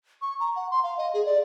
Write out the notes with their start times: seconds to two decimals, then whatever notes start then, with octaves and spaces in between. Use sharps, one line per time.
0.22 C#6
0.40 A#5
0.56 F#5
0.71 C6
0.84 F5
0.98 D#5
1.14 G#4
1.26 D5